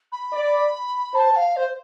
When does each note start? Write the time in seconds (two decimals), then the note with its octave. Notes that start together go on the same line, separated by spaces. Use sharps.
0.12 B5
0.33 D5
1.14 C5 A5
1.35 F5
1.56 C5